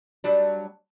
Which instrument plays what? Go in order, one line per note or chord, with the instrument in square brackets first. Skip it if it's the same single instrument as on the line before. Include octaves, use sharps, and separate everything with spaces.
[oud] F#3 G3 D4